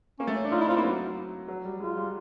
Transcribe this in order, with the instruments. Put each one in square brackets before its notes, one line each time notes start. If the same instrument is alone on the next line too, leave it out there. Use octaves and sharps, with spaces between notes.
[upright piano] A#3 [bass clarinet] C#4
[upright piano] A3
C#4
D4
[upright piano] D#4 [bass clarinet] F4
[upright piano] D4 [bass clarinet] E4
[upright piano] C4 [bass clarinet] F4
[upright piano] A#3 [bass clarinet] E4
[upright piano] F#3
F#3
G3
[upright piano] G#3 [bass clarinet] F4
[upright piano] G3